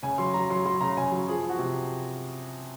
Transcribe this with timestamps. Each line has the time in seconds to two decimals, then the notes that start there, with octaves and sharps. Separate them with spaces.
0.03 C#3 G#5
0.18 F#3 C6
0.34 F#3 A#5
0.50 F#3 C6
0.65 F#3 C6
0.81 C#3 A#5
0.97 C#3 G#5
1.12 F#3
1.28 F3 G#4
1.44 F3
1.49 F#4
1.59 C3